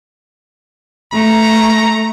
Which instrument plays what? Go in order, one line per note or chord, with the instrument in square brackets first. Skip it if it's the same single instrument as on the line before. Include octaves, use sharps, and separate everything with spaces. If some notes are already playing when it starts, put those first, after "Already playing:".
[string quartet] A3 [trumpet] A#5